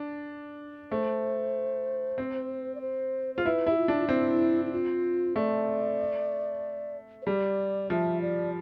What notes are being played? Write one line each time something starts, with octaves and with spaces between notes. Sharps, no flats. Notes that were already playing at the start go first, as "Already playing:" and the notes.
Already playing: D4
A3 C5
C4
D5
C5
F4 C5
E4 B4
E4 G4
F4
D4
F4
C4 E4
E4
F4
A3 D5
C5
G3 D5
F3 E5
D5